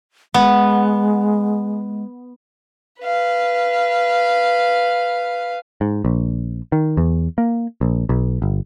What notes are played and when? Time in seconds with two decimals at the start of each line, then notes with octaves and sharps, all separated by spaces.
0.34 G#3 B3
3.01 B4 F5
5.81 G#2
6.05 A#1
6.72 D#3
6.97 E2
7.38 A#3
7.81 A#1
8.09 B1
8.42 G1